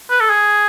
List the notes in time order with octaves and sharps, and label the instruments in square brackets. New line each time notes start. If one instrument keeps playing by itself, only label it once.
[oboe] B4
A4
G#4